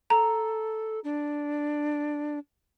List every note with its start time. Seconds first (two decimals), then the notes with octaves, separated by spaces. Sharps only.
0.10 A4 A#5
1.04 D4